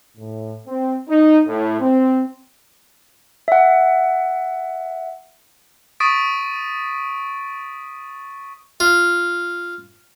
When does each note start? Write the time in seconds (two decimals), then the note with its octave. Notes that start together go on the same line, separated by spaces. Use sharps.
0.17 A2
0.67 C4
1.08 D#4
1.48 A2
1.81 C4
3.48 E5 F#5
6.00 C#6 D#6 A6 B6 D7 D#7
8.80 F4